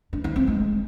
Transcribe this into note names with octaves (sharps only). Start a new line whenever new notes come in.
D4
D#4
C4
G#3